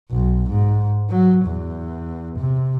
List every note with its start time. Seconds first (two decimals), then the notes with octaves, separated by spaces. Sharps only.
0.11 B1
0.50 G#2
1.09 F#3
1.46 E2
2.39 C3